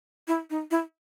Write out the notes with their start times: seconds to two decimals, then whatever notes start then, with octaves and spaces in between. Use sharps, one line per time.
0.28 E4
0.50 D#4
0.71 E4